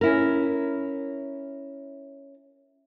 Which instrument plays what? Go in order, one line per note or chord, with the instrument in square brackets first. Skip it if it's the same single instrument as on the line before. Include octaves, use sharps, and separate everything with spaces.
[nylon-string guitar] C#4 E4 A#4